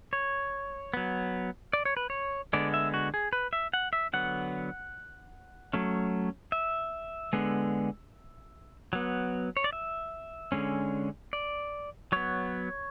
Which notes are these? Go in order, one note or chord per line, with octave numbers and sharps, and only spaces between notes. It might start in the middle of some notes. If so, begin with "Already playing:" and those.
C#5
F#3 B3
D5
C#5
B4
C#5
D3 G#3 B3 D5
E5
F#4
G#4
B4
E5
F#5
E5
D3 F#3 B3 F#5
F#3 A3 C#4
E5
D3 G#3 B3
F#3 B3
C#5
D5
E5
D3 G#3 C#4
D5
F#3 B3 C#5